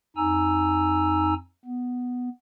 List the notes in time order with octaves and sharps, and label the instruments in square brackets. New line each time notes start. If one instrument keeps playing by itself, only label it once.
[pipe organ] F2 D#4 G#5 A#5 E6
B3